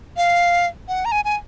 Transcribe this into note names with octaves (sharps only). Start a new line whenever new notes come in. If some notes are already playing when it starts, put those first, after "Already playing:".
F5
F#5
A#5
G#5
G#5